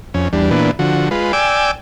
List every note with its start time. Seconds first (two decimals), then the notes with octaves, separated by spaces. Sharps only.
0.14 F2 C#4
0.33 E2 G3 D4
0.51 A#2 E3 B3 D4
0.79 D3 F3 F#4
1.11 G#3 F4 B4
1.33 D5 G5 G#5 D6 E6